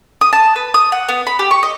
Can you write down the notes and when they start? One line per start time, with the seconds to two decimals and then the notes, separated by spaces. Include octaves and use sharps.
0.21 D#6
0.33 A5
0.56 B4
0.74 D#6
0.92 F#5
1.09 B3
1.27 B5
1.39 G4
1.51 C#6
1.63 D#5